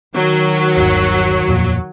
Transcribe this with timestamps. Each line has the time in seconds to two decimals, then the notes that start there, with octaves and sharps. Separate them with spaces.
0.16 D#3 F#3
0.77 G1 D#2
1.48 D#1 F2 A#2